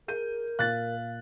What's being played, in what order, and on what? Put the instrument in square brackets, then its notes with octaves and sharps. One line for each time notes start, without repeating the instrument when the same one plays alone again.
[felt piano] G#4 G6 D#7 [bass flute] A#4
[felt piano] A#2 [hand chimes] F5 [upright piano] F#6 A6